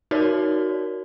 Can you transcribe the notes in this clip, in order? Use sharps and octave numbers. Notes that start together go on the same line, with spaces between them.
D#4 F#4 A#4 C#5 D5